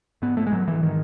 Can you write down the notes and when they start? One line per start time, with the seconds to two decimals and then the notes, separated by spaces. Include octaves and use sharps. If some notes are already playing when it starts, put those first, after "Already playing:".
0.22 G#2 B3
0.37 A3
0.47 G#3
0.52 G#2 F#3
0.68 E3
0.83 D#3